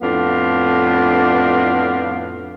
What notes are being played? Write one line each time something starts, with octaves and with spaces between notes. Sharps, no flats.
F2 A2 B3 D4 B4 F5